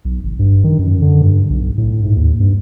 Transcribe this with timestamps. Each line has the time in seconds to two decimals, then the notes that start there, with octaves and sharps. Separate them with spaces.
0.05 B1
0.24 G#1
0.39 G2
0.64 D#3
0.79 F#2
1.01 D3
1.22 G2
1.50 B1
1.78 A2
2.03 G#2
2.16 D#2
2.40 G2